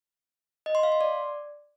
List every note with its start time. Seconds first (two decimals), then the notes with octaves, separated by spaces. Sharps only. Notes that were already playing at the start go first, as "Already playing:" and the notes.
0.66 D#5
0.75 C6
0.83 F5
0.92 C6
1.01 D5